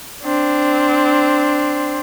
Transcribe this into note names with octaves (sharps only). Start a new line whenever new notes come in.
C4 D4